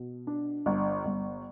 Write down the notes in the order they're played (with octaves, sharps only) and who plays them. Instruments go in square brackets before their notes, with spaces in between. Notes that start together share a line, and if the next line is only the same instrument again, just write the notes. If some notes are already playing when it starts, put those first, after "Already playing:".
Already playing: [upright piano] B2
D4
G1
G1